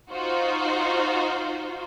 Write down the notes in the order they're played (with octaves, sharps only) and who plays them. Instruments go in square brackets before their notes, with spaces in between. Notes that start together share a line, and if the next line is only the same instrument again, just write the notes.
[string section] D#4 F4 F#4 C5